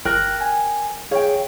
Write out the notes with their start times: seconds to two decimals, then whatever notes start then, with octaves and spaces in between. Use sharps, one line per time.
0.05 G1 A#4 G5 F#6 A#6
0.41 G#5
1.11 G#4 C#5 F5 G5